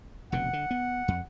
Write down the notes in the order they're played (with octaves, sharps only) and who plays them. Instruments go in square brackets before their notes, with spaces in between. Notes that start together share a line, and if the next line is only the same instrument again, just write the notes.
[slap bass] F1 B2 D3 [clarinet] F#5
[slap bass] D3
B3
F2